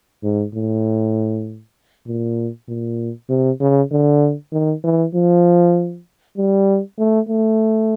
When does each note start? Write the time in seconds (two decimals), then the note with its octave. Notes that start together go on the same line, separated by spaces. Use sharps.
0.23 G#2
0.54 A2
2.07 A#2
2.68 A#2
3.30 C3
3.60 C#3
3.91 D3
4.53 D#3
4.84 E3
5.14 F3
6.37 G3
6.98 A3
7.29 A3